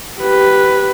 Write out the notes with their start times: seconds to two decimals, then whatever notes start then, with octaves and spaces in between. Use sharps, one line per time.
0.20 G4 B4